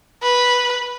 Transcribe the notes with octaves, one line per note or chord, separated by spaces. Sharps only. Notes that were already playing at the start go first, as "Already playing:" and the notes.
B4